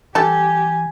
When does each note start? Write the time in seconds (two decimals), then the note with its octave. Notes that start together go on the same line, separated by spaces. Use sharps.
0.15 E3 G3 G4 A4 G#5 A5